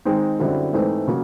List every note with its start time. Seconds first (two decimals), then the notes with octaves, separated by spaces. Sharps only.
0.05 D#3 G#3 C4 D#4
0.39 F#2 D3 G3 C4 E4
0.73 G#2 E3 A3 C4 D#4
1.08 C#3 F#3 A#3